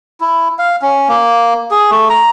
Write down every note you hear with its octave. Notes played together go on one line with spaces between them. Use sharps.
E4
F5
C#4
A#3
G#4
A3
A#5